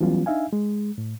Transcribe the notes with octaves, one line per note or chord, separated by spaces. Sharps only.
E3 F#3 G3 B3 C#4 F4
D4 D#4 E5 F5 G#5
G#3
A2